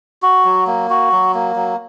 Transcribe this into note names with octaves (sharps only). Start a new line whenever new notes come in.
F#4
F#3
A#3
F#4
F#3
A#3
F#3